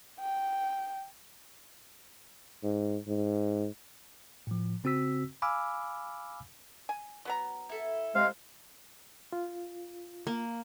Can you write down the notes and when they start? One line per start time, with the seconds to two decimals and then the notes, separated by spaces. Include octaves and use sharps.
0.21 G5
2.64 G#2
3.08 G#2
4.47 A2 F3
4.84 C#3 C4 F#4 E6 B6
5.42 F5 G#5 B5 D6 E6 F6
6.89 G#5
7.25 F#3 B3 A#5
7.69 E4 A4
8.16 C3 G#3 F5
9.33 F4
10.27 A#3